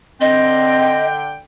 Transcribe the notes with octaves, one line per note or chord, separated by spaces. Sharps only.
D3 C4 D#5 G5